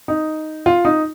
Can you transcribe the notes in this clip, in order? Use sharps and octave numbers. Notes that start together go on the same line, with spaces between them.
D#4
F4
D#4